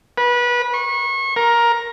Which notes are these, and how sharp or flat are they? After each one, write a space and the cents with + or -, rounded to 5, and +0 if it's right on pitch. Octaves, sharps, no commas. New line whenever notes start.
B4 -25
C#6 -30
A#4 +10